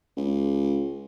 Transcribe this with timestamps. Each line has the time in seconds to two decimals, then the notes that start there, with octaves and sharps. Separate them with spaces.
0.17 C#2